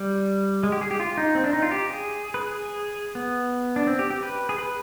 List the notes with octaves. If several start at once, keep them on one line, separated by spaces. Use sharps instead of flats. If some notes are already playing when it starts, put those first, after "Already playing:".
Already playing: G3
G#3
G4
G#4
G4
F4
D#4
C4
D4
D#4
F4
G4
G#4
B4
G#4
B3
D4
C4
G4
G4
B4
G#4
B4